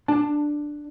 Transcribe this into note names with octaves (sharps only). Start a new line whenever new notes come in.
D4 A5